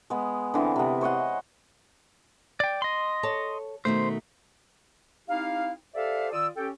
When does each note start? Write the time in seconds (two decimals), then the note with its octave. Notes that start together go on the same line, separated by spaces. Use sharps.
0.10 G#3 B3
0.54 D3 E3 C4
0.76 C3 B3
1.01 C5 C#5 D#5 F#5
2.60 D5 G5
2.82 D#5 C6
3.23 A4 C#5 A5
3.85 B2 D#3 A3 C5
5.29 C4 D#4 E4 G4 F5
5.95 G4 A4 C5 D5 E5 F5
6.33 D#3 F4 D5 D#6 E6
6.57 C#4 G4 A4 G5